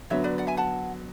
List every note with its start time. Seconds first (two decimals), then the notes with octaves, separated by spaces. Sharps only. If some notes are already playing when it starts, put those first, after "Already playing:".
0.10 D3 F#3 B3 C#5 E5
0.24 B4 D5
0.38 D5 F#5
0.47 E5 G#5
0.57 F#5 A5